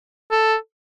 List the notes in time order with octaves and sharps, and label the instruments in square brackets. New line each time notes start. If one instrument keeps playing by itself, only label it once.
[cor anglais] A4